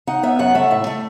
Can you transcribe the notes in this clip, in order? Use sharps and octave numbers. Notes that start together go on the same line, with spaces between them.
D#4 F#5
B3 E5
F#2 F#5
A3 E5
A2 E5
A3